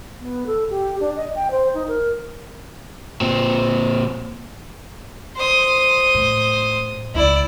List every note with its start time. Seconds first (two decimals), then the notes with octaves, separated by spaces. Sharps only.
0.21 B3
0.46 A4
0.70 G4
1.00 D4
1.16 D#5
1.35 G5
1.51 C5
1.74 D#4
1.88 A#4
3.21 A#2 C4
5.36 C5 D#6
6.15 A2
7.15 C#2 C4 E4 D5